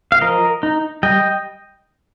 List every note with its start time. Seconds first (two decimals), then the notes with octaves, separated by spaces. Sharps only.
0.12 F5
0.21 F3 A#4 D#5
0.63 D#4
1.03 G3 D#5 G5